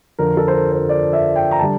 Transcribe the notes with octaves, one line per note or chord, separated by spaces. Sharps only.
F2 D3 F3 A#4
A4
C5
A#4
C5
D5
E5
G5
A#5
D3 G3 A5